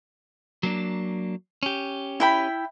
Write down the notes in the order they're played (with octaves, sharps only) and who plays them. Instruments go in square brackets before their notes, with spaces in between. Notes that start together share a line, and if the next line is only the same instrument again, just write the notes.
[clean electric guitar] F#3 A#3 D4
C#4 G4
[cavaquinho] E4 G5 B5